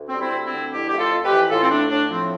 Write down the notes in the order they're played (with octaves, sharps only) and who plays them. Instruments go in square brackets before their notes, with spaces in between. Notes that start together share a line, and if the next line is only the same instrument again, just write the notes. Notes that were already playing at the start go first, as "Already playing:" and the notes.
Already playing: [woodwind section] D2
C4
G3
C4 E4
D2
C4 E4
D3
F2 E4 G4
A3 G4
F4 A4
F2
G4 B4
E3
A2 F4 A4
C4
A3 D4
A2 D4
F3 C4